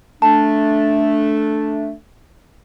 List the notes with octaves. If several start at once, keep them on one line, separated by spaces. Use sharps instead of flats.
A3 D4 A5